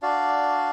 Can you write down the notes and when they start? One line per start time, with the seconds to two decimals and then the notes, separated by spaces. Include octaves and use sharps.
0.02 D4 F#4 D5 F5